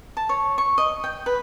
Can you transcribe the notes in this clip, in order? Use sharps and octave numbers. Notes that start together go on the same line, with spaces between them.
A5
C#5
C#6
D#5
G5
B4